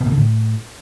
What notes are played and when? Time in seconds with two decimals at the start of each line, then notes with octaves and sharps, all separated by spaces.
0.01 B2
0.06 A#2
0.12 D3
0.17 A2